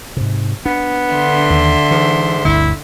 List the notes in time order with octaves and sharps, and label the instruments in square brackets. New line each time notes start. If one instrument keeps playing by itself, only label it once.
[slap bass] G#2 C3
[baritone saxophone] B3 [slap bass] D4
[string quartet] D3 E5 C6
[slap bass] D#2
[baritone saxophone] G#2 [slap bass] E3
[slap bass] G1 D2 [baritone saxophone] E4